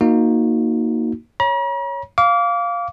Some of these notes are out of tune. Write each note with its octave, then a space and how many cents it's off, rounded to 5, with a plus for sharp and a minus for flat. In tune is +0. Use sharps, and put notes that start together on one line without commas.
A#3 +0 D#4 +0 F#4 -25
C#5 +0 A#5 +45
F5 +0 D6 -30